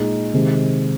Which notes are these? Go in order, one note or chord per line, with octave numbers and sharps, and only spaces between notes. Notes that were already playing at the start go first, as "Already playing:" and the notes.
Already playing: A#2 G#3 D#4 G#4
C3 D#3 G#3